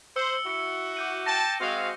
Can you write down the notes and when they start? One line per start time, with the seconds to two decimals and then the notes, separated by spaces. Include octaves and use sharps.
0.16 C5 E6 C#7 G7
0.46 E4 F#4 E6 C#7
0.97 D6 G6 D#7
1.26 G5 A5 A#6
1.61 G#3 C4 F#4 F5